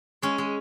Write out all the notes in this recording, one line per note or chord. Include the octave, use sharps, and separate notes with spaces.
G#3 C#4
G#3